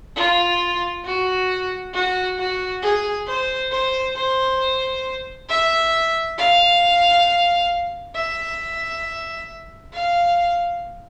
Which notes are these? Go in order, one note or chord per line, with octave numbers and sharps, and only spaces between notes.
F4
F#4
F#4
F#4
G#4
C5
C5
C5
E5
F5
E5
F5